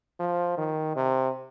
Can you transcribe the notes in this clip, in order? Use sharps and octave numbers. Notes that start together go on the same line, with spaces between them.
F3
D#3
C3